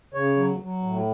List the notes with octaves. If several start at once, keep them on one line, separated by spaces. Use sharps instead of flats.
C#3 C#5
F#3
F#3
A2